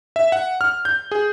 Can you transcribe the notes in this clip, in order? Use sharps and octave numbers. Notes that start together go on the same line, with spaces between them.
E5
F#5
F6
G6
G#4